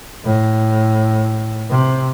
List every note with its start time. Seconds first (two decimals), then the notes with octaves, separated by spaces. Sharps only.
0.24 A2
1.70 C3